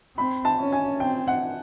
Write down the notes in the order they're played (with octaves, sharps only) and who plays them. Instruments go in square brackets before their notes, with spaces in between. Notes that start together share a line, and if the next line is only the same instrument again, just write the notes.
[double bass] C4 [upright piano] B5
[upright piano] A5
[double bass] C#4
[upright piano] G#5
[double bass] C4 [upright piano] G5
[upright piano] F#5